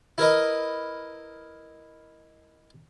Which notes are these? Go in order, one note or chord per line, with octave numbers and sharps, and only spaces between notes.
E4 A#4 B4 D#5